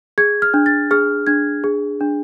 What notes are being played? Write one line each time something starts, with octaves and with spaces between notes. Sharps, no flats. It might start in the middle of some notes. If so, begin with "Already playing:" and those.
G#4 G#6
F6
D4
A6
G#4 F6
D4 G#6
G#4
D4